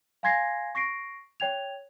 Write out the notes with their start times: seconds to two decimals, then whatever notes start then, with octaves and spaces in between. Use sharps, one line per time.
0.23 F5 G#5 C6 G#6 A#6 C7
0.75 C#6 A#6 C7 D7
1.40 C#5 G5 G#6 F7